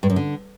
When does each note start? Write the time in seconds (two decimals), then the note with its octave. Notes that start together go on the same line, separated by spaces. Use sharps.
0.03 G2
0.10 F#2
0.16 D3